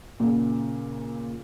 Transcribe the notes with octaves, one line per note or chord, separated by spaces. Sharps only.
A#2 C#3